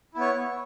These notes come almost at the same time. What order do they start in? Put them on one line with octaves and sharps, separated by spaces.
E4 B3 C#5